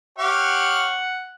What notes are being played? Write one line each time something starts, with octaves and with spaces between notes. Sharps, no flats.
G4 C#5 F5 F#5